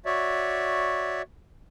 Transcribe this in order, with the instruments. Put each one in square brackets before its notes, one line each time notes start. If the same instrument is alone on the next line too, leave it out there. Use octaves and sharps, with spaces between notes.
[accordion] F#4 C#5 D5 E5